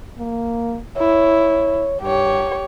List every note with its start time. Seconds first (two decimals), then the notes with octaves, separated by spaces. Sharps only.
0.19 A#3
0.98 E4 C#5
2.02 G2 G4 C#5